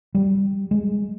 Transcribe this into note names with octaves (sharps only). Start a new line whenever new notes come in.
G3
G#3